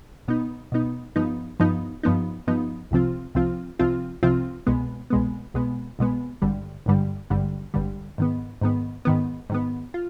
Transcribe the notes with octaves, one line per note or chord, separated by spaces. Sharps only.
B2 B3 D#4
B2 B3 D#4
G2 F3 B3 D#4
G2 F3 B3 D#4
G2 F3 B3 D#4
G2 F3 B3 D#4
C2 C3 F3 C4 F4
C2 C3 F3 C4 F4
C2 C3 F3 C4 F4
C2 C3 F3 C4 F4
C2 B2 G#3 B3
C2 B2 G#3 B3
C2 B2 G#3 B3
C2 B2 G#3 B3
G#1 G2 D3 G3
G#1 G2 D3 G3
G#1 G2 D3 G3
G#1 G2 D3 G3
G#2 D#3 B3
G#2 D#3 B3
G#2 D#3 B3
G#2 D#3 B3
F4